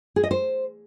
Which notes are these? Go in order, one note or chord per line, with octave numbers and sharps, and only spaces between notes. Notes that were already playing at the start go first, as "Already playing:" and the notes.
G#4
D#5
C5